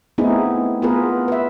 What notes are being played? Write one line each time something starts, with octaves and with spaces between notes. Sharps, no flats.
A3 B3 C4 D#4 E4 G#4
B3 F4 G#4 A#4 B4
B4 E5